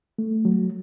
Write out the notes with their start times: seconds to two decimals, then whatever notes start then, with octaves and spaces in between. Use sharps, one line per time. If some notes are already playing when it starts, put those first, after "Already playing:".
0.18 A3
0.45 F#3